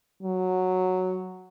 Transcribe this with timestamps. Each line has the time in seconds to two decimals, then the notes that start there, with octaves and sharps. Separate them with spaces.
0.23 F#3